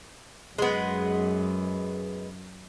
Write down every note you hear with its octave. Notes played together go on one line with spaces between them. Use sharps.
F#2 G#3 B3